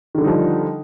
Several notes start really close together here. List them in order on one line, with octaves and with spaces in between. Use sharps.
D#3 D3 G3 D#4 F3